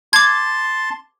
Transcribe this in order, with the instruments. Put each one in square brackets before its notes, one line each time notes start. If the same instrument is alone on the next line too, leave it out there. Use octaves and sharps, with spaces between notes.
[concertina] A5 C6 [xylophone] D6 G#6